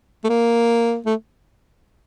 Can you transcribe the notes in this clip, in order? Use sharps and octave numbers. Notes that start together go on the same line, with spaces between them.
A3
A#3
A3